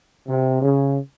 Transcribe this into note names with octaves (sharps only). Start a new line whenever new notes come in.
C3
C#3